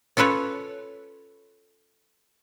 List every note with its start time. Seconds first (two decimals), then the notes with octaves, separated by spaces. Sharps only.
0.17 C#4 F4 A4 B4 C#5